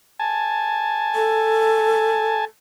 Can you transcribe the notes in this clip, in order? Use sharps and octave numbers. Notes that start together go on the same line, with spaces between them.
G#5 A5
A4